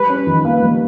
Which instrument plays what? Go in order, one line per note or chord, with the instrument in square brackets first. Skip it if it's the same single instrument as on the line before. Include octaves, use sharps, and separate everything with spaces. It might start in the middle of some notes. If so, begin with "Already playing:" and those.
Already playing: [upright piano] G3 [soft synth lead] B4
[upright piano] C#4
D#3
A#3
G3